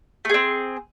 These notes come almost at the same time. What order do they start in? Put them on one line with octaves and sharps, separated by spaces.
A3 G#4 C4